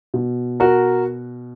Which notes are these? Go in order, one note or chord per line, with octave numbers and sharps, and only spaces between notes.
B2
F#4 A#4